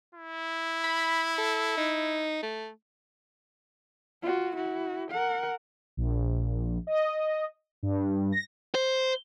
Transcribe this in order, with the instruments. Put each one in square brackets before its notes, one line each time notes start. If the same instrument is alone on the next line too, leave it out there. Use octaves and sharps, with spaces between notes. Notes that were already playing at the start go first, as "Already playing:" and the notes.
[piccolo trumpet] E4
[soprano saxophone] B5
A4
D#4
A3
[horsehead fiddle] F4 F#4
E4 F#4
A#4 F#5
[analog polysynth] A#1
D#5
G2
A#6
[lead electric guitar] C5